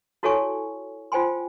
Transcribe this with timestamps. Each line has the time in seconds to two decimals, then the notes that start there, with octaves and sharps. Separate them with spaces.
0.23 E4 F#4 A4 C#5 G#5 C#6
1.12 F4 C5 G5 G#5 C6